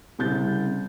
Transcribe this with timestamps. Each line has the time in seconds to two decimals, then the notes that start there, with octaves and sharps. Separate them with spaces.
0.19 C2 C#3 G6 A6